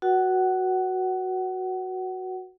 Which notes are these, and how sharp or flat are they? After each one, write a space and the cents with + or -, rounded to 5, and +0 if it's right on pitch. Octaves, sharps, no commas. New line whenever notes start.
F#4 +0 B4 -35 F#5 +25